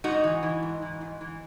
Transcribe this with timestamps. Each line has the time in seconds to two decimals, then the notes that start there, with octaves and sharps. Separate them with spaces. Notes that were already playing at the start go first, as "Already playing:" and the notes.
0.04 G#2 D#4 F#4
0.24 E3
0.43 E3
0.62 G#2
0.82 E3
1.01 G#2
1.21 E3